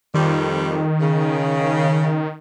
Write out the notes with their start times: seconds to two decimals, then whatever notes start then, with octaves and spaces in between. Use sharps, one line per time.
0.14 F2 D#3 G3
1.00 C#3